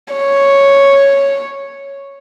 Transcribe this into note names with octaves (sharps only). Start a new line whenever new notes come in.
C#5